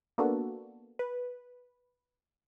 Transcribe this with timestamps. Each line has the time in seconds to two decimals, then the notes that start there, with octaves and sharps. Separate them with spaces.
0.18 A#3 B3 D4 F#4 A4
0.99 B4